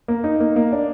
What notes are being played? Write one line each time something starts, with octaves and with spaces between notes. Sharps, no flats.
A#3
D#4
A#3
A#3
D4